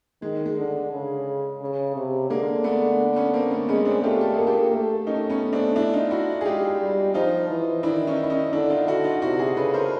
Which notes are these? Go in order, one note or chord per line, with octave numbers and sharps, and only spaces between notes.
D#3 G#3
G#3
D3
C#3
C#3
C3
D3 G#3 A#3
A3 B3
B3 C#4
A#3 C4
A3 B3
G#3 B3 C#4
C4 D4
A3 F4 G4
A4
A#3 G#4
G4 A4
A3
C#4 D#4
B3 C#4
C4 D4
D4 E4
D#4 F4
E4 F#4
G#4
G#3 F4 G4
G3
F3 D#4 F4
E3
D#3 D4 E4
C#4 D#4
E4
C#4 D#4
D3 D4 E4
D#4 F4
D3 E4 F#4
D#4 F4
C3 E4 F#4
F#4 G#4
C#3 A4 B4
A#4 C5